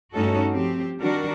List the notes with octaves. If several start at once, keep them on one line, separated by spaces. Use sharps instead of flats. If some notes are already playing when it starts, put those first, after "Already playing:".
G2 A3 C#4 D#4 F#4 A4
F3 C4 G4
D#3 G3 D4 F#4 A#4